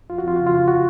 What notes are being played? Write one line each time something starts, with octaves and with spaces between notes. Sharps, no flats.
F2 F4
F#4
F2 F4
C#3 F#4
F4
C#3
F#4